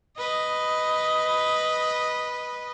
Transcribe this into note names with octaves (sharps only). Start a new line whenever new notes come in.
B4 D#5